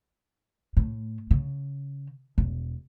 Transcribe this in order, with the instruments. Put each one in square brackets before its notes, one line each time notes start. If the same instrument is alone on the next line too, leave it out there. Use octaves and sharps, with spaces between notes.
[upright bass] A2
C#3
E1